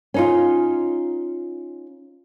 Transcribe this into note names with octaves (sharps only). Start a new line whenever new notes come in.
C#4 D#4 F4